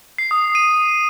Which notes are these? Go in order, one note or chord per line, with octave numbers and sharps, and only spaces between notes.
C7
D#6
D#7